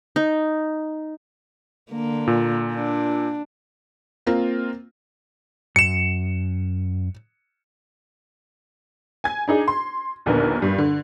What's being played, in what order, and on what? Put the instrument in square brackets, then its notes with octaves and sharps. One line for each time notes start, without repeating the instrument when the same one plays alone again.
[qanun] D#4
[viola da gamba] D3 A#3
[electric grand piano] A#2
[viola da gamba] D4
[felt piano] A#3 C4 F4 A#4
[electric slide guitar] F#2 [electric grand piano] C#7 E7
[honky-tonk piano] G#5 G#6
D4 D#4 G#4
C6
A#1 D#2 D3 B3 A#4
G2
D3